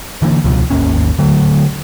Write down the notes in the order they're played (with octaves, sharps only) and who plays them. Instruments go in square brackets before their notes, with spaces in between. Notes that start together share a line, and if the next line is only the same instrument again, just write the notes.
[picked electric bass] D3 E3 A#3
C#2 B2 F3
G#1 D#2 A#3 C#4
D3 F#3 A3